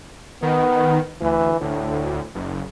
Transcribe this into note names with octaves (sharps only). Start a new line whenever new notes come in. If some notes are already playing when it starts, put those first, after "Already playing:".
D#3 B3
D2 E3
D2 A2
F#1